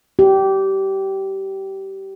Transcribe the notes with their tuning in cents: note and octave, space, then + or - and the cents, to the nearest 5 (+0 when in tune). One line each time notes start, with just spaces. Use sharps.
G4 -20